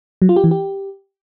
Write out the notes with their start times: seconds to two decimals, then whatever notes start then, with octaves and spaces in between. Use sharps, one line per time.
0.22 F#3
0.29 F4
0.36 G4
0.44 E3
0.51 G4